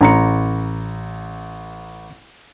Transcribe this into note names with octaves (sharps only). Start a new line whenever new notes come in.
A1 A#5 C#7